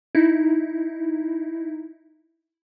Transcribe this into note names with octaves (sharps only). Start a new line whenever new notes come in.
D#4 E4